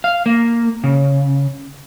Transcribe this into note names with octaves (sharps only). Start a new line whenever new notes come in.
F5
A#3
C#3